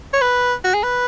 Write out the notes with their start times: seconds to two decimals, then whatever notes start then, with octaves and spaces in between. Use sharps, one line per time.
0.13 C#5
0.21 B4
0.64 F#4
0.74 G#4
0.83 B4